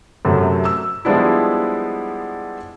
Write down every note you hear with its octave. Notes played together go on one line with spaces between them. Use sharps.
F#2 C3 F#3 A3
E6
F3 G3 G#3 B3 D4 E4